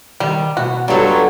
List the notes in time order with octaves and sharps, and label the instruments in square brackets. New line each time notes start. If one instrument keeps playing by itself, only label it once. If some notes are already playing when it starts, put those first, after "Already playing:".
[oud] D#3 [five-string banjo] G3
[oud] B2 [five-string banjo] F#4
[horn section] G2 B2 F#3 [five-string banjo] G3 [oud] F4 A4